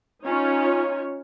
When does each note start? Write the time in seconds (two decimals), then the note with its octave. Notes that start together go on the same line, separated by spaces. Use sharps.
0.24 C#4 D#4 F4 C#5